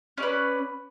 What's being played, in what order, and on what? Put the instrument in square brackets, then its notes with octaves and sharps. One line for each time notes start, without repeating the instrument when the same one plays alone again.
[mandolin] C#4
D5
B4